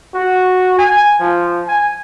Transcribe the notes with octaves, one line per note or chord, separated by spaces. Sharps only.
F#4
G#5
F3
G#5